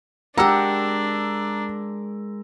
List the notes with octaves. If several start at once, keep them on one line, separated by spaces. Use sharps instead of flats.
G#3 D4 G4 A#4 F#5 A#5 E6